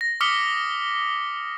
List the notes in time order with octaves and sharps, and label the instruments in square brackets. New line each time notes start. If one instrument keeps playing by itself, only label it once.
[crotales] A#6
D6 D#6 F6 B6 C#7 G7